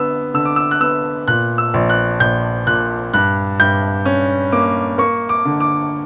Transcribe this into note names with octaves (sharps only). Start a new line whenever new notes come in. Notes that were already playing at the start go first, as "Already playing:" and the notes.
Already playing: D3 B3 E6
D3 E6
D6
E6
F#6
B3 E6
A#2 F#6
E6
A#1
F#6
A#1 G6
A#2 F#6
G2 F#6
G2 G6
C#4
A#3 D6
A#3 C#6
D6
D3
D6